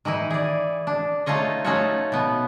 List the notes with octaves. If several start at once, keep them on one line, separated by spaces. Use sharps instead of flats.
D#3 E3 D#4 E4
G#4 D5
D4
A3 D#4 F4 C#5 D#5
A3 C#4 D#4 F4 F#4 C#5
B2 B3